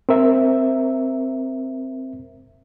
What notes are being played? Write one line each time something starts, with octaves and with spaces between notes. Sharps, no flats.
C4 A#4 E5